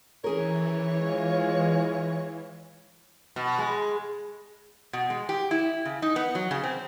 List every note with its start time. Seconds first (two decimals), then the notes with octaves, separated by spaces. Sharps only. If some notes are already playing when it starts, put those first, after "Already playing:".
0.24 E3 C#4 G#4 A#4 C#5
1.00 G#3 F4
3.36 B2
3.58 G#3
4.93 B2
5.10 G#3
5.29 G4
5.51 E4
5.85 C#3
6.02 D#4
6.16 B3
6.35 F#3
6.51 C#3
6.64 C4